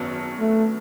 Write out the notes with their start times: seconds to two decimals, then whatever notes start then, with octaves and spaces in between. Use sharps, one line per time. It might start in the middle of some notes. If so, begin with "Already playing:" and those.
Already playing: G#1 F#2 F#3 B3
0.40 A3